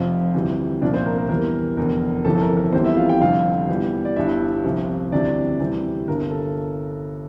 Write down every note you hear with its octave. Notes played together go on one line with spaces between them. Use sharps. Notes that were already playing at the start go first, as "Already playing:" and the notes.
Already playing: F1 F2 C3 F3 F4 F5
D2 C3 E3 G3
C2 A#2 F3 D4 D5
C4 C5
A#4
A#4
E2 E3 G3 A#4
F1 E2 D3 A#4
G1 F2 C3 E3 A4
A4
A#4
A#4
F1 E2 C3 E3 G3 C4 C5
E4 E5
F4 F5
G4 G5
F1 F2 D3 G3 F4 F5
E2 E3 G3
D5
G1 G2 D3 G3 E4 E5
C2 C3 F3
D2 C3 E3 G3 D4 D5
D2 C3 E3 G3
G1 G2 D3 A#4
A4